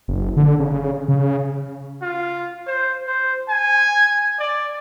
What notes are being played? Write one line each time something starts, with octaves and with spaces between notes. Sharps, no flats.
F#1
D3
C#3
C#3
F4
C5
C5
G#5
D5